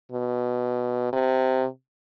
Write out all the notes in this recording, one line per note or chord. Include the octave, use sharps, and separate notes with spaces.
B2
C3